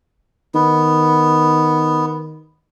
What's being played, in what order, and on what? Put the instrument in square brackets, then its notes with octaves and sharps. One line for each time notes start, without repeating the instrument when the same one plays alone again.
[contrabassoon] D#3 [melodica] B3